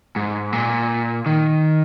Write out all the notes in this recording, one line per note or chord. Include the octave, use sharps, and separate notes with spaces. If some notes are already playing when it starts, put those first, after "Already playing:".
G#2
A#2
D#3